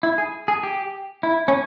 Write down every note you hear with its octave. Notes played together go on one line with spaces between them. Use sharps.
E4
G#4
G#4
G4
E4
C#4